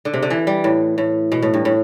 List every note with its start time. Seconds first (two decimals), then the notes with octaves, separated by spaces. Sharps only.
0.05 D3
0.14 C3
0.22 D3
0.30 E3
0.47 G3
0.64 A2
0.98 A2
1.32 B2
1.42 A2
1.54 G2
1.65 A2